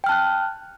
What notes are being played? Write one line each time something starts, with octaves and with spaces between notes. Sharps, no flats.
G5 A5 F6 F#6